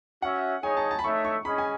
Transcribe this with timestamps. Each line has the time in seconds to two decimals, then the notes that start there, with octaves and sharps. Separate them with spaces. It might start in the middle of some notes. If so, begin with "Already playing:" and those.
0.22 C#4 F#4 C#5 E5 F#5
0.63 D#4 G#4 C#5 G#5
0.77 A5
0.91 A5
0.99 B5
1.04 A3 D#4 A4 C#5 E5 C#6
1.25 C#6
1.45 C#4 G#4 D#5 B5
1.58 G#5